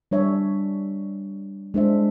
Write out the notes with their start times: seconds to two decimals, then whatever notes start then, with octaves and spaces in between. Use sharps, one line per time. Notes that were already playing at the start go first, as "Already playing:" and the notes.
0.11 G3 D4 C#5 E5
1.74 G#3 D4 C5 E5